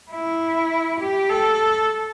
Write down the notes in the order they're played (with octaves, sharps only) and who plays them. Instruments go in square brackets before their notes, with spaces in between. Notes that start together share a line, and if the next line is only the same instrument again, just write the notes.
[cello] E4
G4
A4